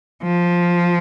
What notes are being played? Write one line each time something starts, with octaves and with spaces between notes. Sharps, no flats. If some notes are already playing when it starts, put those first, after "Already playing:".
F3